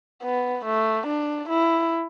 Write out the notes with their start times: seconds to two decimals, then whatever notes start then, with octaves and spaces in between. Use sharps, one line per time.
0.23 B3
0.65 A3
1.07 D4
1.50 E4